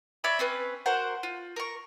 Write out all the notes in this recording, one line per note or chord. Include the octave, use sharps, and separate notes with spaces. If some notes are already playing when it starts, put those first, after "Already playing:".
C#5 D5 E5 B5
C4 C#4 B4
F#4 A#4 C5 F#5
F4
A#4 C#6